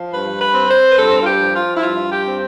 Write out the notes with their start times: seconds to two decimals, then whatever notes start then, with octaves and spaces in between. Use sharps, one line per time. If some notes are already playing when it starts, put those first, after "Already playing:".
Already playing: F3
0.13 G2 B4
0.41 B4
0.54 C4
0.69 C5
0.89 B4
0.97 G2 A4
1.21 F4
1.26 G4
1.41 F3
1.54 F4
1.75 E4
1.83 G2 F4
2.11 G4
2.25 C4